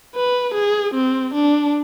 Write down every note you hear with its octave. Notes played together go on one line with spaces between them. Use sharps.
B4
G#4
C4
D4